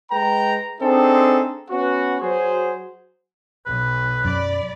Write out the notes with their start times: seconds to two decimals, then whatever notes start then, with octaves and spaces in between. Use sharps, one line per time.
0.12 G#3 B4 G5 A#5
0.81 C4 D4 D#4 G#4 A4
1.71 B3 C#4 F#4
2.22 F#3 F#4 G#4 C5
3.66 B1 B4
4.25 F#2 D5 B5